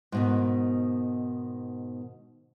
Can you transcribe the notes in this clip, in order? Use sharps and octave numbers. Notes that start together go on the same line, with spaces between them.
G#2 B2 D#3